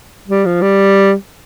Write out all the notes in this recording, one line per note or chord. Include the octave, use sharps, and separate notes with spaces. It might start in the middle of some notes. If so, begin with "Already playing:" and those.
G3
F3
G3